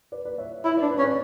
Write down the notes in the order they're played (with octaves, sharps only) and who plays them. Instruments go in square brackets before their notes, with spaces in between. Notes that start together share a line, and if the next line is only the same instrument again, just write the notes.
[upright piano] B4 D5
B4 D5
C#5 E5
[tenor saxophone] E4 [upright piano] C#5 E5
[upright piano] B4 D5
[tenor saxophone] D4
[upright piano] B4 D5
[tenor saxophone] C#4
[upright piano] B4 D5